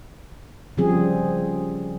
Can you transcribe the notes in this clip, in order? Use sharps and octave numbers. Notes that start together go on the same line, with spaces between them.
C#3 F3 G3 C4 G#4